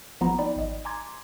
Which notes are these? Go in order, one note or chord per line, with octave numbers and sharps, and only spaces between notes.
G#1 F3 B3 F4 A#5 B5
D#4 D5 G5 B5
G#1 D#5
G#5 A#5 C6 D6 G#6 A6